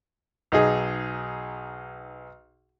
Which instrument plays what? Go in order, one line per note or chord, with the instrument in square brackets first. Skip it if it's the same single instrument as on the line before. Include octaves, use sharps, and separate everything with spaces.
[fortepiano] B1 D#4 G#4